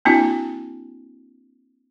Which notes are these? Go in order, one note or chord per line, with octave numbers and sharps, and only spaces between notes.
A#3 C4 D4 E4 F#4